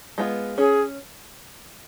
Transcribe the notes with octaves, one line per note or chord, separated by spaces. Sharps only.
G#3 B3 F4
C#4 G#4